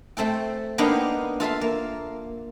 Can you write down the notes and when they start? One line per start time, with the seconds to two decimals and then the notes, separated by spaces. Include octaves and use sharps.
0.17 A3 C4 A4 G5
0.78 A#3 B3 D4 D#4 F5 G5
1.40 F4 A4 E5 C6
1.61 A#3